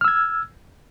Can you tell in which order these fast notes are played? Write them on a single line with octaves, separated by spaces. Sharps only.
F6 E6 G#6